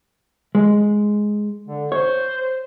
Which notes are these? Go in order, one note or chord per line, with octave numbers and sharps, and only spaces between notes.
G#3
D3
C5 C#5